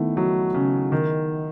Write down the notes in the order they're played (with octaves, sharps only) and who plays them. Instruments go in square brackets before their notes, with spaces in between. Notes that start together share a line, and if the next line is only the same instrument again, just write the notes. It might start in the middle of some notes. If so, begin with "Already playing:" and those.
Already playing: [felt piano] D#3 B3 E4 [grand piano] A3
[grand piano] F#3
C#3
D#3